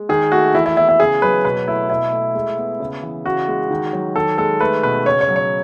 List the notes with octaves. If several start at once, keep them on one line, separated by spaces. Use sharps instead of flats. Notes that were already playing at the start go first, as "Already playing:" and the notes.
Already playing: G#3
D#3 G#4
A3 F#4
E3 E4
E4
B3 E4
E4
C#3 G#4
F#3 B4
B2 B4
A3 E4
B2 E4
A3
G#3
B3
C#3
E3
C#3 F#4
G#3
D#3
F#3
D#3 A4
G#3 A4
A3 B4
B2 B4
C#3 C#5
C#5
F#3
C#5